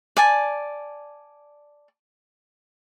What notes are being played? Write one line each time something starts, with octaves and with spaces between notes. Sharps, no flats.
D5 G#5 A5